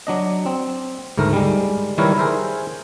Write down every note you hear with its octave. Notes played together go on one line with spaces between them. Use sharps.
F#3 D4 D#5
C4
D2 G#2 A3 A#4
G3 G#3
D#3 G3 E4 A#4 B4 C#5
G#4 A#4 C5 E5